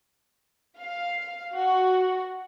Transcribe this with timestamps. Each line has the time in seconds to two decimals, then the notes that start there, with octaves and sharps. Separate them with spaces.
0.77 F5
1.55 F#4